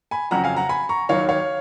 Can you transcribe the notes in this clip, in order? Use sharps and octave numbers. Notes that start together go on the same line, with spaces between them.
G#5 B5
F2 C#3 F#3 F#5 A#5
F5 G#5
F#5 A#5
G#5 B5
A#5 C#6
D#2 D#3 F#3 C#5 F5
C#5 F5